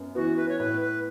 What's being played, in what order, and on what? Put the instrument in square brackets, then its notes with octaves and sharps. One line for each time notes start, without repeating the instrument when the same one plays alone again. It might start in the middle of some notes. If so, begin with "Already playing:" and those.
Already playing: [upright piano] F#2 B3
[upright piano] E3 B3 [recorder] F#4
[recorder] B4
C#5
[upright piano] A2 [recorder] B4
[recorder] B4